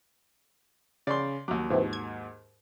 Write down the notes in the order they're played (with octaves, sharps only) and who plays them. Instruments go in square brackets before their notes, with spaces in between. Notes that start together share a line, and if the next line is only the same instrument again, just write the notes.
[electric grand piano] C#3 [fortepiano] D5 C6
[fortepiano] D#2 F#3 [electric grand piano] D6
[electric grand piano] G#2 [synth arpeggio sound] C3 E3 F3
[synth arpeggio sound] G#6